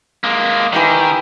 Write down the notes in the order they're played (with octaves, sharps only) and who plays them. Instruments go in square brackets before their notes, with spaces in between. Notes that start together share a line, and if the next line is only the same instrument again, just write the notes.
[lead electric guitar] G#3 A#3
[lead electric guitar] D#3 [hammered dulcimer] E3 G4 D#5